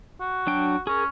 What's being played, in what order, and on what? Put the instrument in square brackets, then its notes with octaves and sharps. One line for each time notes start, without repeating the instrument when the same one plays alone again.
[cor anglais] F#4
[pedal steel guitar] F#3 D4 G5
[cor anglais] C#4 [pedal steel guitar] G#4 A#4